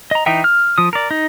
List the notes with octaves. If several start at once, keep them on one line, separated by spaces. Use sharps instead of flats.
D#5 A#5
E3 D#4 E5 G5
F6
F3 D#6
A#4 D5
D#4